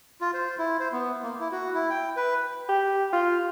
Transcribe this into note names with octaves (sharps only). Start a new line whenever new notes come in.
F4
C5
E4
C5
B3
A#3
E4
F#4
E4
G5
B4
G4
F4